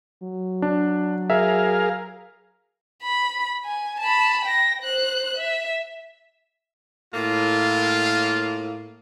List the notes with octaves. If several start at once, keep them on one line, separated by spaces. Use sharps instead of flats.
F#3
D4
G#4 A#4 E5 F5
B5
G#5
A5 B5
G5 A#6
C5 F#6
E5
A2 A#3 F4